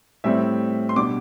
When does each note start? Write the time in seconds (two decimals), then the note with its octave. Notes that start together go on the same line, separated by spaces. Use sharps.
0.24 A2 G3 C4 E5
0.89 C6
0.96 B2 G3 D4 D6